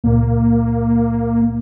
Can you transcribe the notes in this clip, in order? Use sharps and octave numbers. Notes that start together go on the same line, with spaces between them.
C#2 A#2 A#3